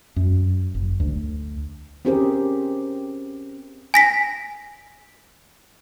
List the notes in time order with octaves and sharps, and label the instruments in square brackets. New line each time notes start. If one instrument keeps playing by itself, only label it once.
[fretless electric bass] F#2
F#1
D2
[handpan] C4 C#4 G4 G#4 A#4 C5
[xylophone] G#5 A#6 B6